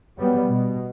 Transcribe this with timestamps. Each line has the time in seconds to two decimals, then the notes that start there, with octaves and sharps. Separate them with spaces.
0.17 F#3 G3 B3
0.48 B2